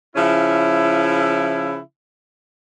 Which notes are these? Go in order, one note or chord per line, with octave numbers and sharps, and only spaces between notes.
C#3 F3 C#4 E4